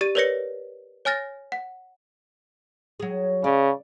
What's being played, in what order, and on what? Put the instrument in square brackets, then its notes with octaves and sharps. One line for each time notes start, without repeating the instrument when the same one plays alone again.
[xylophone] G4 D5 A6 D#7
A#4 B4 C#5 D5 A#6 C#7
C#5 G#5 F6 A6 A#6
F#5
[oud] F#3 G#4
[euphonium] C#3 [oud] D5